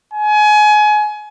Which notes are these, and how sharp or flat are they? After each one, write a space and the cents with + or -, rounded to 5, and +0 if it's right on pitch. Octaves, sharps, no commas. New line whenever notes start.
G#5 +25